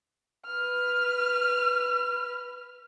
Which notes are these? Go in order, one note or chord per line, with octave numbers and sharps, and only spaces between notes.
B4 F6